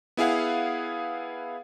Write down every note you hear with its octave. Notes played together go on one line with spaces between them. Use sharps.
B3 E4 G#4 F5 F#5